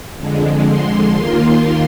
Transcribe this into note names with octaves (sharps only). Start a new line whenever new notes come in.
F2 D3 G#3
C6
D#2 D#3 A#3 F4